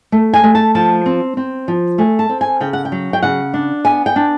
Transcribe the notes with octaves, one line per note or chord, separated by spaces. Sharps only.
A3
G#5
A3
A5
F3 A5
C4
C4
F3
A3 G#5
A5
C4
G#5
C#3 G5
F#5
G5
F#3
G5
C#3 F#5
D4
B3 G#5
G5
D4